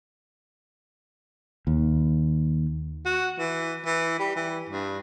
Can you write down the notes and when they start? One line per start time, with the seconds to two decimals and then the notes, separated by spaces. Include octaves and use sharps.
1.67 D#2
3.06 F#4
3.39 E3
3.86 E3
4.19 G3
4.36 E3
4.69 G2